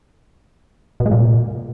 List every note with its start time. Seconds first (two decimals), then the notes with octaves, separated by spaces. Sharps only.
1.00 B2
1.06 G#3
1.11 A#2